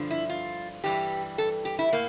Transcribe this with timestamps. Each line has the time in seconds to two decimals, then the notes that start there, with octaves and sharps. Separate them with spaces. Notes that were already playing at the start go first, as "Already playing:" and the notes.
Already playing: G2 D3 F3
0.11 E4
0.30 F4
0.83 G2 E3 G3 G4
1.38 A4
1.65 G4
1.79 E4
1.92 A2 A#3